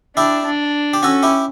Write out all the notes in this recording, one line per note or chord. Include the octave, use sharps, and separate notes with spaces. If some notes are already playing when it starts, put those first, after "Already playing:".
D4 E4 G4
D4
G4
C#4 F#4 A4
E4 G4